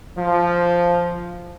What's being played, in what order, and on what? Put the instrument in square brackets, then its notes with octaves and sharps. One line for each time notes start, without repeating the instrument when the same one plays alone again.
[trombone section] F3